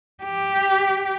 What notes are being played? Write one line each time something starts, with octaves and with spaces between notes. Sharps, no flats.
G4